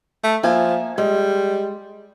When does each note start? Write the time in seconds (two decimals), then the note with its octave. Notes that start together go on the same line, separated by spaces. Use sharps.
0.23 A3
0.43 F3 A#3 E5 G#5
0.98 G3 G#3